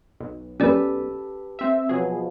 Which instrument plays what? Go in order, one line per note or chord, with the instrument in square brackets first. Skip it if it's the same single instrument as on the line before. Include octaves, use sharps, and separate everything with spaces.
[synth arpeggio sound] B1
[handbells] C#4 D5 [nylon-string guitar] G4 A4 B4
[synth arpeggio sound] C4 E5
[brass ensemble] B2 F3 [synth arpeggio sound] F#3 G#4